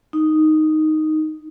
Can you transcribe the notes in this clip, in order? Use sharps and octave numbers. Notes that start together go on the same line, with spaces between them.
D#4